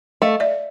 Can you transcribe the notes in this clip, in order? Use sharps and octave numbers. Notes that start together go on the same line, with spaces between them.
A3 D#5 F5
D5 E5